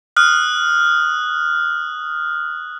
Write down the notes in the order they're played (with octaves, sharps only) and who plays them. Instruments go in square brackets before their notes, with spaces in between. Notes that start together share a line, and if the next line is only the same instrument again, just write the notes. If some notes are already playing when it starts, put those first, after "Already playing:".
[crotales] D#6 F6 F#6